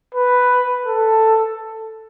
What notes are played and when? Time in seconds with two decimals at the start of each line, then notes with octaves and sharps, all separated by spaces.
0.15 B4
0.86 A4